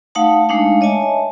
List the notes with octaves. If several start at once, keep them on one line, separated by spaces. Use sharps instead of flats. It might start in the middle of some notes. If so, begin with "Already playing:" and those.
A3 D#4 F5 F#5 A5
G#3 A3 D4 D#4 F5
C#5 D#5 E5 G#5 A5